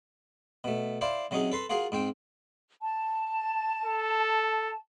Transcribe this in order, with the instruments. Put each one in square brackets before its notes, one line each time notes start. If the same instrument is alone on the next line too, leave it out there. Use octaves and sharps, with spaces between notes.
[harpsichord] B2 A3
E4 C5 D5 F5
C3 F#3 C#4 D#4 G#4
A4 B4 C6
F4 F#4 G#4 A#4 F5
G#2 C4 G5
[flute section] A5
[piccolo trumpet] A4